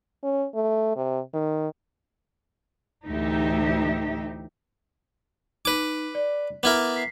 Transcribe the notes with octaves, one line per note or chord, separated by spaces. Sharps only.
C#4
A3
C3
D#3
D2 A2 E3 D#4 G4 E5
D#4 B4 D6
D5
B3 E4 A#4 D6
B6 C7